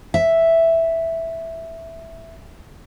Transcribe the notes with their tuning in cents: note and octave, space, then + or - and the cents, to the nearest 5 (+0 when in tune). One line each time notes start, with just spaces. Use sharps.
E5 +0